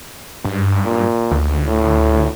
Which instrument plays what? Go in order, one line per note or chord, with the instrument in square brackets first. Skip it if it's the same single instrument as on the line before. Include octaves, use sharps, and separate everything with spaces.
[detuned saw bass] G2
[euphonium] A#2
[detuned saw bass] D2
[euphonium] A2